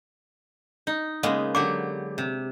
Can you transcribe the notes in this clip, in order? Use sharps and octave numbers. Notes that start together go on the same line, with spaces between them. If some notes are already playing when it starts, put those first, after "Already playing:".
D#4
C#3 G#3 A#3 B3 D#4
D3 F#3 G4 D6
C3